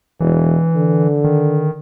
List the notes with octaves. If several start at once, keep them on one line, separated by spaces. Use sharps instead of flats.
E1 E3
D3
D#3